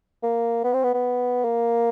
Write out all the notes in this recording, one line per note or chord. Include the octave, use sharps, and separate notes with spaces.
A#3
B3
C4
B3
B3
A#3